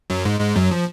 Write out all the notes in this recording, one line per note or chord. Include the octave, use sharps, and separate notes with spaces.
F#2 F#3
G#2 G#3
G#2 G#3
F#2 F#3
F3